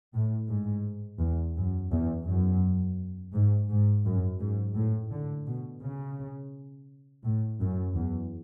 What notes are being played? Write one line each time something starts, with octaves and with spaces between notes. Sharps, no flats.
A2
G#2
E2
F#2
E2
F#2
G#2
G#2
F#2
G#2
A2
D3
B2
C#3
A2
F#2
E2